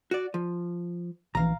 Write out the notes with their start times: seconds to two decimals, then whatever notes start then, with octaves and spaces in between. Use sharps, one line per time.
0.11 F#4 D5
0.34 F3
1.35 A#1 E3 F5 A#5